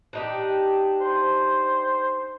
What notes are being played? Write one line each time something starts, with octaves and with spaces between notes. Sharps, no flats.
D4 D#4 G4
C5